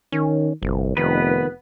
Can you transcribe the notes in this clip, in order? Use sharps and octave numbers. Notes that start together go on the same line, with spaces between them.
D#3 C#4
G1 C2
F1 D#3 B3 B4